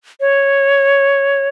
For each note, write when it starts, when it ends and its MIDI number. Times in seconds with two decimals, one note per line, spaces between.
0.21 1.49 73